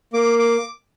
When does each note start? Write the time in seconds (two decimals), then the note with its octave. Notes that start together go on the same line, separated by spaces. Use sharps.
0.13 A#3 D6
0.39 D6